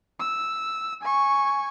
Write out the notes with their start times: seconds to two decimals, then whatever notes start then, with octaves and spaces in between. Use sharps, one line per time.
0.19 E6
1.02 G#5 C#6